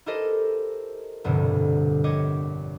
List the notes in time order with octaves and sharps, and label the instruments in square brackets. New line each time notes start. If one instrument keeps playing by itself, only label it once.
[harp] E4 G4 A4 A#4 C5 D#5
F1 C2 G2 B2 D3
A#1 G4 C#5 D#5 D6